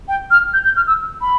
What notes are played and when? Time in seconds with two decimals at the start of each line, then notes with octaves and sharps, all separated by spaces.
0.08 G5
0.31 F6
0.53 G6
0.65 G6
0.76 F6
0.87 E6
1.21 B5